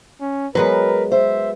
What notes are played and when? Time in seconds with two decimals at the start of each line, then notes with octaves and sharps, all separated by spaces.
0.21 C#4
0.55 F#3 G#3 B3 A#4 B4
1.12 C5 E5